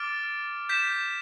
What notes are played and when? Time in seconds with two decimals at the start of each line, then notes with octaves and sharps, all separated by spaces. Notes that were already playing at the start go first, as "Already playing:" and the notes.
Already playing: D6 F6 A6 D7
0.69 G6 B6 E7